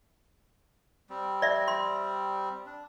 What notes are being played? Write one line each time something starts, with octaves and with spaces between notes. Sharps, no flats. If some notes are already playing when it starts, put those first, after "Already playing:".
G3 C4
D5 E5
C6
D4